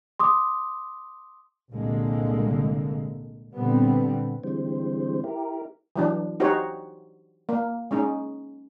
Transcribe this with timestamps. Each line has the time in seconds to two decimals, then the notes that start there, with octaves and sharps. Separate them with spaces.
0.20 C6 D6 D#6
1.72 C2 A#2 D3 G#3 A#3
3.53 A#2 D3 G3 B3 C4
4.44 D3 E3 G3 G#3 C4 C5
5.24 E4 G4 A#4
5.96 E3 F#3 D4
6.40 D#4 F#4 G4 C5 C#5
7.49 A#3
7.91 G#3 C#4 D#4